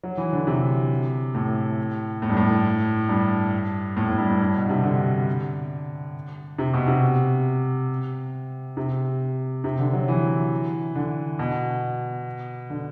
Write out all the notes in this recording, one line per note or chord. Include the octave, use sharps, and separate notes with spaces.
F#3
E3
D3
C3
A2
A2
G2
A2
G2
A2
A2
G2
G2
G2
B2
C3
D3
C3
B2
C3
C3
C3
D3
F#3
E3
D3
B2
D3